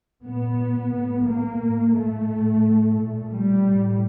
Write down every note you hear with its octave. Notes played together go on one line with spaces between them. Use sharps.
A#2 B3
A2
A#3
A2
A3
A2
A#2
G3
A2